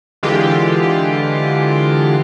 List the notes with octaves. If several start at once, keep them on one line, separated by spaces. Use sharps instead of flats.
D3 E3 G#3 F4 G4